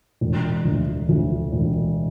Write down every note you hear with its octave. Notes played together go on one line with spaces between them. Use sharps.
E1
D2
D2
E1